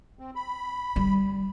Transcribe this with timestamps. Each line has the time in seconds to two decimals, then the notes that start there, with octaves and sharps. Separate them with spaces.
0.19 C4
0.35 B5
0.96 G3